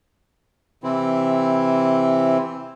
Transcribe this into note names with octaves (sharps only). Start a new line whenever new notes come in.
C3 E3 C4 E4